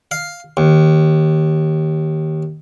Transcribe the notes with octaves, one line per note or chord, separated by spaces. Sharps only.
F5
D#2